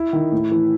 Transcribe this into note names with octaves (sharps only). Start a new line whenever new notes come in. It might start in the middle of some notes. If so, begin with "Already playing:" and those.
Already playing: E4
D#3
A2
E3